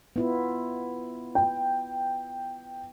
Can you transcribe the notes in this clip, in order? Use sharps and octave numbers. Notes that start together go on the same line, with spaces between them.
B3 E4 F4
G5